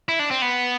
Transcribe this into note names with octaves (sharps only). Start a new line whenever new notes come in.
E4
D4
C4
B3